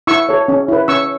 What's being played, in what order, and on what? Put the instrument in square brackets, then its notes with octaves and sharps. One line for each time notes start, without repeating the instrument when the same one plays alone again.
[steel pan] E4 C#6 E6
A4 C#5
C#4
E4 B4
C#4 C#6 E6